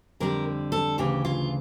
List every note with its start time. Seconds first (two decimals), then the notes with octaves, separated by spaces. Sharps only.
0.20 F2 D3 G3 A#4
0.72 A4
0.98 D2 C#3 E3 G4
1.25 F4